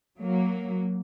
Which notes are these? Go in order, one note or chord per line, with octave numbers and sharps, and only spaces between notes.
F#3 A#3